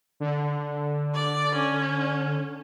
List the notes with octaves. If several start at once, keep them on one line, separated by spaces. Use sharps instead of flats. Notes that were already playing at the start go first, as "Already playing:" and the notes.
D3
D5
C#4